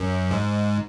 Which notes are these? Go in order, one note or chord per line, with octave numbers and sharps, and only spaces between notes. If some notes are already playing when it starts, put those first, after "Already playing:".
Already playing: F#2
G#2